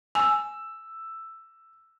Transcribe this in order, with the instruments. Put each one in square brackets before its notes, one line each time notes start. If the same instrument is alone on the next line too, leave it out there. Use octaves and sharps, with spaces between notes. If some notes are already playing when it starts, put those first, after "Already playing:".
[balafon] G#5 [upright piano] E6